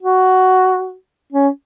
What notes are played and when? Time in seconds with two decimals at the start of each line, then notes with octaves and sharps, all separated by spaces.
0.03 F#4
1.33 C#4